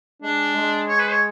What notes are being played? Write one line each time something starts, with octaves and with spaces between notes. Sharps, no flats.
G#3 D4
G#3
C#5
B4
C#5